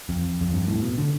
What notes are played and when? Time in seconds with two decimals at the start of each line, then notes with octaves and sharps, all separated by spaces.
0.09 F2
0.41 F2
0.53 G2
0.68 A2
0.82 B2
0.98 D3